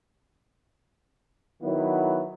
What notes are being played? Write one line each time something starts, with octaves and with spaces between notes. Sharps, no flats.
D#3 F#3 B3 E4